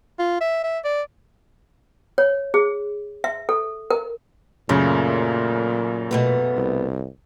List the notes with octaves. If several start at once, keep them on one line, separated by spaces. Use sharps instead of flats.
F4
E5
E5
D5
C#5
G#4
E5
A4
A#4
F#2 A#2 C#3 A3
B2 A3 B3
C2